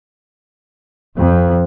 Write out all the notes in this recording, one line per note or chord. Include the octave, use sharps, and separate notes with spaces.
F2